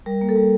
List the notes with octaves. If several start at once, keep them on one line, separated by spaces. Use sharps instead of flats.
G3 A#4
A#3
A4
G3